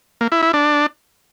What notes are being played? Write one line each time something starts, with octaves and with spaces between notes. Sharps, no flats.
A#3
E4
E4
D4